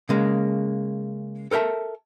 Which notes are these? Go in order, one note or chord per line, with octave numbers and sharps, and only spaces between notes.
C#3 G#3 A#3
A4 A#4 C5 E5 A5